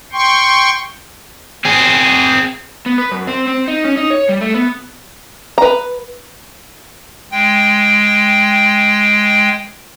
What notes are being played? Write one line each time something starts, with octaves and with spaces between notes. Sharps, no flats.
G5 C6 C#6
C4 G#4
B3
B4
F#2
C4
C4
D#4
C#4
D#4
C#5
G3
A3
B3
B4 A#5
G#3 G5